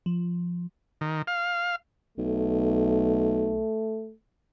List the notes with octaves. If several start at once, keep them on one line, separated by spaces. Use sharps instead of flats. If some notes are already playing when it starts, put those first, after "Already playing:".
F3
D#3
F5
B1 A3